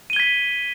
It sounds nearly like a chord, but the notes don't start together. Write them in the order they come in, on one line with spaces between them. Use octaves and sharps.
D#7 G7 G#6 B6